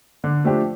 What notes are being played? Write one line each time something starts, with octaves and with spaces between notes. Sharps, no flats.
D3
F3 A3 D4 G4